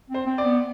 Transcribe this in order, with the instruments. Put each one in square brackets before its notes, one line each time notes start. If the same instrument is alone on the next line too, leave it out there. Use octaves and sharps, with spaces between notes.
[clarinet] C4 [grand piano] C5
[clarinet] C4
[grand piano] D5
[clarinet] B3